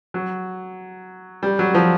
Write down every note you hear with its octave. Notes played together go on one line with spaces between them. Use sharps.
F#3
G3
F#3
F3